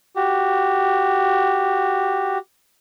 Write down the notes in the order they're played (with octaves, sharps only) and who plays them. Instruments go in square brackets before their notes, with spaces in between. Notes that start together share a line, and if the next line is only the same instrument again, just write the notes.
[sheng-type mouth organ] F#4 G4